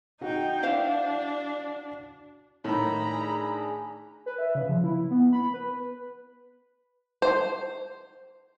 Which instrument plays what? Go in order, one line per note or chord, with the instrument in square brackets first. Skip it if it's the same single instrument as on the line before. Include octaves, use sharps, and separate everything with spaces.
[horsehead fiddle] D#4 G5 [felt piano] F#4 F#5
[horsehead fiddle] D4 [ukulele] E4 C5 F5
[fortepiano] A2 D#3 [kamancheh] A#5 B5
[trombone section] D4 G#4
[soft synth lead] B4
E5
C#3
F3
E4
B3
B5
B4
[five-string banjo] C5